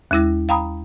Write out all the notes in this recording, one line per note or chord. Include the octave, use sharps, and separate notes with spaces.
D#2 G#3 E4 E6 A#6
F5 G5 A#5 B5 D#6